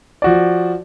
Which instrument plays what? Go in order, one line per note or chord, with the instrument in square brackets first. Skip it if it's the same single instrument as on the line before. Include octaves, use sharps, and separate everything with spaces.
[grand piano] F3 F#4 D5